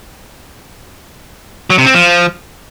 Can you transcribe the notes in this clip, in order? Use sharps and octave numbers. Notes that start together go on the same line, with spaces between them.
F#3
C3
C4
F3